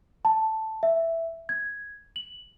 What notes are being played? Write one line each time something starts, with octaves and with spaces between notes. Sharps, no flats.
A5
E5
G#6
F#7